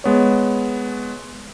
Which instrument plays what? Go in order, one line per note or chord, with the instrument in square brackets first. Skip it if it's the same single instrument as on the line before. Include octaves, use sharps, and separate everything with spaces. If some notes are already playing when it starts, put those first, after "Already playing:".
[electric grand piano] G#3 B3 C#5